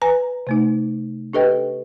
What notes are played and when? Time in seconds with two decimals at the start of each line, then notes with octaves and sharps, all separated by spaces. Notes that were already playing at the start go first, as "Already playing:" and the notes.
0.02 B4 G#5 A#5
0.47 C3 A3 D#4
1.33 D4 G4 A4 B4 D#5 G5